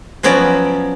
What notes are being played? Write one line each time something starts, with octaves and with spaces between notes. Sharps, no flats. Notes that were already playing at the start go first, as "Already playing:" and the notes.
F3 F#3 B3 C#4 F#4 D5